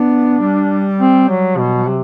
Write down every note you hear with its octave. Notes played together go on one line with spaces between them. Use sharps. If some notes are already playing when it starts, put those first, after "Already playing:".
Already playing: B3 D4
G3
C4
F#3
B2 F#3
C3